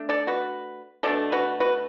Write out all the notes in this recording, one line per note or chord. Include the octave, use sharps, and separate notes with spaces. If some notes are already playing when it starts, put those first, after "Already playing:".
Already playing: A3 D4
A4 D5
F#4 B4
B2 A3 D4 A4 D5
F#4 B4
F#4 B4